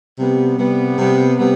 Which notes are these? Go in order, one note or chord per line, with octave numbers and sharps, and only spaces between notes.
C3 G3 B3
C3 G3 B3
C3 G3 B3
C3 G3 B3